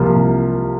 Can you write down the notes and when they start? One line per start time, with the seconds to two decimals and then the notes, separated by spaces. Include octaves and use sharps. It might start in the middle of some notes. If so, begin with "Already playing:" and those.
Already playing: C2 C3 F3 A#3 F4
0.16 C2